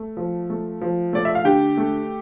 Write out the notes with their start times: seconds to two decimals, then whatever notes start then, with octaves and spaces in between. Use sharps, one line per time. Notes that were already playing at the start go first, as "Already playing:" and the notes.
Already playing: A3
0.17 F3
0.50 A3
0.81 F3
1.13 A3 D5
1.25 E5
1.35 F5
1.45 D3 G4 G5
1.77 A3